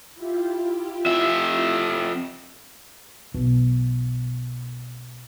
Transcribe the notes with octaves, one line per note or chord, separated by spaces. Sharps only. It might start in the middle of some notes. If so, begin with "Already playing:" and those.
E4 F4 G4
F2 E5
B1 B2